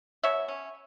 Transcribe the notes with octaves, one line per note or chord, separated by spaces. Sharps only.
B2 C#5 E5
C#4